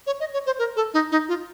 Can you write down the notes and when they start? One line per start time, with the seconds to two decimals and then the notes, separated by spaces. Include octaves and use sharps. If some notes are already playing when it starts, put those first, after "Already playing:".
0.07 C#5
0.20 D#5
0.33 C#5
0.46 C5
0.59 A#4
0.76 A4
0.94 D#4
1.12 D#4
1.28 F4